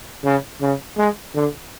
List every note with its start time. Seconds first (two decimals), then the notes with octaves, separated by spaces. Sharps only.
0.25 C#3
0.61 C#3
0.98 G#3
1.35 D3